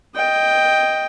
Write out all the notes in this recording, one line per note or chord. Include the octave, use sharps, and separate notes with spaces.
D#5 G5